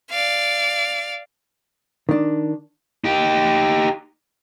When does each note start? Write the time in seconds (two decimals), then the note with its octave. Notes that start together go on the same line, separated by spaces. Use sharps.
0.10 D5 F5
2.09 D#3 D4
3.04 D#4 G4